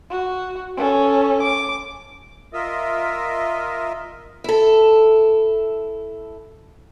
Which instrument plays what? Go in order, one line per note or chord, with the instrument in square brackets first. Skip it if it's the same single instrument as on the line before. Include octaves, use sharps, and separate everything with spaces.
[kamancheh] F#4
C#4 A4
D6
[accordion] F4 A#4 D#5 E5
[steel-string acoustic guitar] E4 A4